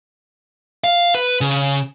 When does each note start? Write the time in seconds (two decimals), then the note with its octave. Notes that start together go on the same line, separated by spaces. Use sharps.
0.84 F5
1.15 B4
1.41 C#3